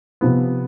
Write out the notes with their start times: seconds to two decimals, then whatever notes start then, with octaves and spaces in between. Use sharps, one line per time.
0.21 C3 F3 B3